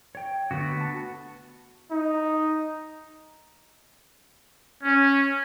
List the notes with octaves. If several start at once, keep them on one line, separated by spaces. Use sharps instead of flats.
C#5 G5
D3 A3 B3 F#4
A5
D#4
C#4